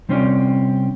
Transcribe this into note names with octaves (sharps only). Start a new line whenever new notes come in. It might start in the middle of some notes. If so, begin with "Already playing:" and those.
C3 G3 C4 C#4 C#5 D5